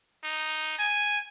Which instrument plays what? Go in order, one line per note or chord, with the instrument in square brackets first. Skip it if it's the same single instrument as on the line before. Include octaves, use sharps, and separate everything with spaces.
[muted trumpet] D#4
G#5